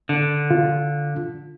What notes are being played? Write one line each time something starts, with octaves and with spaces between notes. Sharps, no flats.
D3
F4